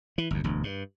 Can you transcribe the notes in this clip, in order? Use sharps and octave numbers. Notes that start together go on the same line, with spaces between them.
E3
G1 D2
E1 D2
G2